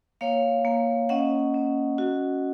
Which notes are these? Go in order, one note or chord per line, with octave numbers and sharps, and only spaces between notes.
A#3 C#5 F5
A#3
C#4 D#5 F#5
C#4
F#4